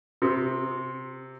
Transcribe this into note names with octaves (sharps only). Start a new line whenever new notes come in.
C3